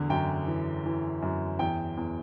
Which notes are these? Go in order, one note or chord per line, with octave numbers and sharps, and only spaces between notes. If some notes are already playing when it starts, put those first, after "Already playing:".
Already playing: E2 D3
F#2 G5
E3
E3
F#2
E2 G5
E2